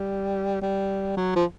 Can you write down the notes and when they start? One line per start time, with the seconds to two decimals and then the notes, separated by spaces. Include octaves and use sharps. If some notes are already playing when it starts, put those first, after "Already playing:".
Already playing: G3
0.62 G3
1.17 F#3
1.36 F3